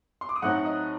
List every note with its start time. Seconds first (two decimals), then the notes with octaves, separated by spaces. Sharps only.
0.21 C6
0.29 D6
0.36 D#6
0.42 A2 F#3 C4 D#4 F#5 F#6
0.65 D#5 D#6